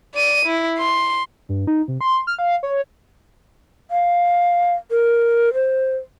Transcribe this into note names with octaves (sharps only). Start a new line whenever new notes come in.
D5 D#7
E4
C6
G2
D#4
C3
C6
F6
F5
C#5
F5
A#4
C5